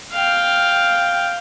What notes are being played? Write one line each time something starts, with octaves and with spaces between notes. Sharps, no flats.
F5 G5